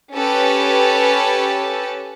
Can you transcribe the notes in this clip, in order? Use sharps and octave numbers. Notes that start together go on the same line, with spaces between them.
C#4 G4 A4 B4